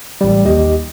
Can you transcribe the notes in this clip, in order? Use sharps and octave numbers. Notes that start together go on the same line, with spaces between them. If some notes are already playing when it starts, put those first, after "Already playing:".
A1 G3
D#2 G4 D#5